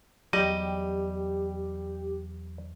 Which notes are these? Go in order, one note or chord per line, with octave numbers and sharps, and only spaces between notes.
E2 F#3 G3 G4 D#5